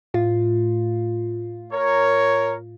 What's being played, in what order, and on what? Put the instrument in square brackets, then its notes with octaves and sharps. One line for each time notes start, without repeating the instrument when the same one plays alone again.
[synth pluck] A2 F4
[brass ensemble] A#4 C#5